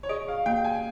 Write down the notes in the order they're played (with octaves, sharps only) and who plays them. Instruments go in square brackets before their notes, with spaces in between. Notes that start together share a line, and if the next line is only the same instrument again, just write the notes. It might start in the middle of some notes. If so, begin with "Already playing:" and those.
[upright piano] C#5
[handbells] G#4 [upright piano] D#5
[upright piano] F5
[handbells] A#3 [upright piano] G5
[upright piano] G#5